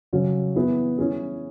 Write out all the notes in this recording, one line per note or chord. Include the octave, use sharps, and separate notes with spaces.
C#3 F#3 C#4 G#4
E3 B3 E4 G#4
E3 C#4 G#4